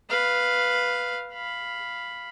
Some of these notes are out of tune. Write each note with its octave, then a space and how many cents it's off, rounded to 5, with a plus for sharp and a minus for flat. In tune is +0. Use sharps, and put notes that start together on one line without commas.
B4 +0 F5 +0
F5 +0 B5 +0